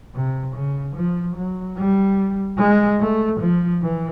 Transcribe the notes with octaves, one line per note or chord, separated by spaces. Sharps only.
C3
C#3
F3
F#3
G3
G#3
A3
F3
E3